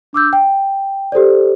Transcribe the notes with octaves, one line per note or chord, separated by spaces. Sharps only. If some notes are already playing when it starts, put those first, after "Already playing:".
D4 D6 E6 G6
G5
G4 A4 C5 D5